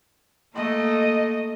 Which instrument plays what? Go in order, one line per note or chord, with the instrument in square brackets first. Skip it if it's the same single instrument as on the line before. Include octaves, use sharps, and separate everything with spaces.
[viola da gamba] A3 A#3 [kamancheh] D#5